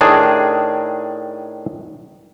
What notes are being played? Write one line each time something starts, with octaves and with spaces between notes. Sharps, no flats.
A2 D#3 D4 D#4 G#4